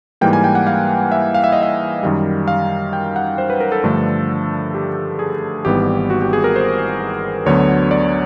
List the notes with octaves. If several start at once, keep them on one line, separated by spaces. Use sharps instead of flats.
G#2 E3 G3 A#3 G5
G#5
G5
F#5
F5
E5
F5
E5
D#5
E5
F#2 D#3 G3
F5
G5
F#5
C5
B4
A#4
A4
G2 D3 F3 A3
G4
G#4
G#1 G#2 E3 G3 B3 G4
F#4
G4
G#4
A#4
C5
D2 D3 F#3 B3 C#5
D5